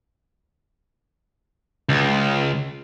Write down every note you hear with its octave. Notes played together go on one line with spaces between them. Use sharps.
C#2